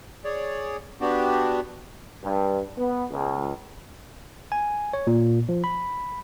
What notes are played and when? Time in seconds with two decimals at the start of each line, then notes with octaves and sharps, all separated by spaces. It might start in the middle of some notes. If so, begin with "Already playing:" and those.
0.24 G#4 C#5 D5
1.01 B3 D4 F#4 G4
2.23 G2
2.78 B3
3.11 C#2
4.52 G#5
4.93 C#5
5.07 A#2
5.49 F3
5.64 B5